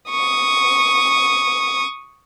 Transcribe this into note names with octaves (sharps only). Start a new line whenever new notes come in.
C#6 D#6